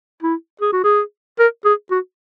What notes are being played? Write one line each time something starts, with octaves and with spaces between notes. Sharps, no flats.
E4
G#4
F#4
G#4
A#4
G#4
F#4